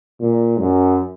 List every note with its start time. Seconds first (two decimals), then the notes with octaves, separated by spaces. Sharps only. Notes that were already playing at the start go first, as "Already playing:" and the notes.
0.20 A#2
0.58 F#2